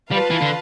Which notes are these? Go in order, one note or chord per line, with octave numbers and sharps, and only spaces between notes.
G3 F4 B4 F5 A5
E3
D3